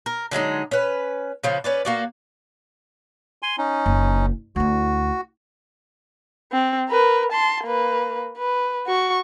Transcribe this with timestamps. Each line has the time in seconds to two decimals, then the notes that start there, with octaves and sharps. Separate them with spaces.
0.06 A#4
0.31 D3 F#3 G#3 D#4
0.71 C#4 B4
1.43 C#3 F3 B3
1.64 C#4 B4 D5
1.85 A#3 F#4 D5
3.42 G#5 C6
3.58 C#4 D#4
3.86 F#1
4.56 D2 E4 F#4
6.52 C4
6.89 A#4 B4
7.32 A5 C6
7.65 A#3 B4
8.38 B4
8.87 F#4 C#6